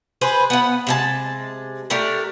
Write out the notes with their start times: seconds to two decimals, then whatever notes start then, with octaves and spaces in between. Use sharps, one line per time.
0.21 G#4 B4 C5
0.50 B3 F#5
0.87 C3 G#3 A5
1.90 A3 D4 G4 A#4